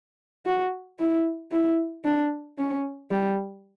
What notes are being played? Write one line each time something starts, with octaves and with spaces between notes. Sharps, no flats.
F#4
E4
E4
D4
C#4
G3